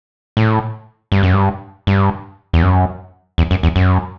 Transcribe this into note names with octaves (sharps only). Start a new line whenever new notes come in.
A2
G2
F#2
G2
G2
E2
F#2
E2
F#2
E2
F#2